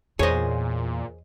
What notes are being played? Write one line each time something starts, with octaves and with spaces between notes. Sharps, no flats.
E2 A#2 G#4 C5 C#5 D#5